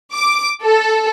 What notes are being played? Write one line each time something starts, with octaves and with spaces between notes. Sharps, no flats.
D6
A4